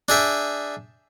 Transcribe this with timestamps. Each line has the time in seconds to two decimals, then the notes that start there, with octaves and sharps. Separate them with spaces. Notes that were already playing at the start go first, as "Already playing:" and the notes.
0.08 D4 G#4 E5 G5